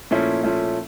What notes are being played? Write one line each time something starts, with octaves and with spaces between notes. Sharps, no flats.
A#2 F3 A3 C#4 E4
A#2 F3 A3 C#4 E4